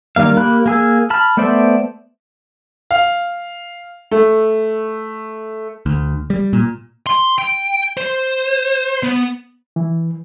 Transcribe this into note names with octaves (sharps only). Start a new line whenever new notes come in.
D#3 G3 A#3 F5
A#3 G4 B5 F#6
A#3 G#4 E6
A5 B5 F6
A3 B3 C5 D5 E5
F5
A3
D2
G3
A#2
C6
G5
C5
B3
E3